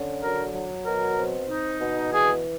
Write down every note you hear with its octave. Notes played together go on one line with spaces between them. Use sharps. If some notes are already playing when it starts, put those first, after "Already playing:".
Already playing: D3 C#4
F#3 A#4
F#3
B2 A#4
C4
D#4
B2
E3 G#4